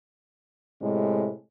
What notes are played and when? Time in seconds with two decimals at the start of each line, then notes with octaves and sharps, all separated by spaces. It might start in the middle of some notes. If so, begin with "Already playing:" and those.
0.81 A2 C3 G#3